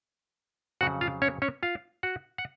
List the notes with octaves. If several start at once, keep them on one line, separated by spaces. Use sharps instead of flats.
F2 C#3 F#3 F#4 F#5
F4 F5
C#4 C#5
C#4 C#5
F4 F5
F#4 F#5
F#5